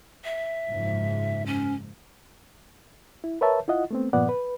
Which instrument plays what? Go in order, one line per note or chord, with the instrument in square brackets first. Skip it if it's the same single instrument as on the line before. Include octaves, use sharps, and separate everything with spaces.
[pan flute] E5
[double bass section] F#1 G#2 F3
[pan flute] C#4
[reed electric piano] E4
A#4 B4 C#5 E5 A5
E4 F4 D#5 F#5
A3 B3 C4
G2 A#2 F3 B3 D5 F#5
B4